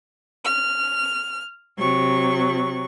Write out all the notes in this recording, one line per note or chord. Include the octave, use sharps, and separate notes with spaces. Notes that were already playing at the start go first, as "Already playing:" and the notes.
F6
C3 F#3 C#6